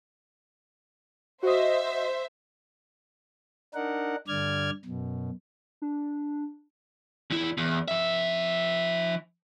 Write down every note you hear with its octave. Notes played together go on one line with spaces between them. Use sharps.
F#4 C5 D#5 E5
D4 D#4 A#4 F#5
G2 D3 D5 F6 G#6
F#2 B2
D4
E2 E4
E2
F3 E5